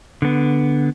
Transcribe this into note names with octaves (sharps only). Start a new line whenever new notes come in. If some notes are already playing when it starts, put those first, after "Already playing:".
D3 B3